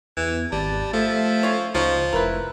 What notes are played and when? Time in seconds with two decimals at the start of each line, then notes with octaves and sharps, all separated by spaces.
0.17 E2 E3
0.52 G#1 G3 A5
0.93 F3 A3 E5
1.43 C#4 F4 C#5
1.75 C#2 F3 D#4 F#4 C#5
2.13 F1 E4 A#4 B4